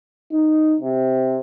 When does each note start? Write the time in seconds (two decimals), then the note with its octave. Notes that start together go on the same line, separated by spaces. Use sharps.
0.31 D#4
0.80 C3